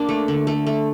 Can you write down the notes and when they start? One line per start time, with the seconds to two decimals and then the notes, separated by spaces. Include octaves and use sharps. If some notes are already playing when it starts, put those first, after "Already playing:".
Already playing: A#3 D4
0.09 A3
0.28 D3
0.47 A3
0.67 A3